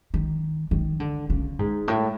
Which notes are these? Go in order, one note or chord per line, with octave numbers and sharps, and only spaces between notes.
D#3
D#3
D3
C#3
G#2
A2